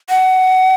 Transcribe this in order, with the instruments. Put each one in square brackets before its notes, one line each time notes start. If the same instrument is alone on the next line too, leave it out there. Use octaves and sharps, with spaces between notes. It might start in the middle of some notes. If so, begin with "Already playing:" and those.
[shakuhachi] F#5